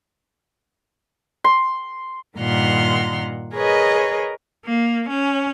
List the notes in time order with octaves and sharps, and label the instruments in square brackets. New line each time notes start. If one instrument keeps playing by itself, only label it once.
[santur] C6
[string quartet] G2 A#2 D#3 F#5 C6 F6
G#4 A#4 B4 C#5 D#5
[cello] A#3
C#4